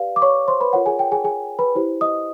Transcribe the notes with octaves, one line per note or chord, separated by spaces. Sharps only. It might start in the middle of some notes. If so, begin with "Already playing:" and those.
Already playing: G4 B4 D5 F5
D6
C#5 C#6
C5 C6
B4 B5
F4 A#4 C#5 F#5
G#4 G#5
G5
G#4 G#5
G#4 G#5
B4 B5
E4 G4 C5
D#5 D#6